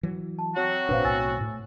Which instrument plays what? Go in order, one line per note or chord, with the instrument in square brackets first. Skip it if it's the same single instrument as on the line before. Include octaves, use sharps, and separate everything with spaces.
[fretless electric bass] E3 F#3
[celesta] A5
[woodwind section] F#3 C4 F#4
[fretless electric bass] A1 A#2 D4 [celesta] B4 C5 F5
[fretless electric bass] B1 A2 [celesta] G#5 E6 A6
[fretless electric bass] A2